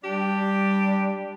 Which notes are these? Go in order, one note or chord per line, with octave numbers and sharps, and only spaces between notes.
G3 D4 G4